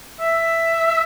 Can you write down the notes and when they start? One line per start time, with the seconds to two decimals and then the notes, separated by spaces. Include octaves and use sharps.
0.21 E5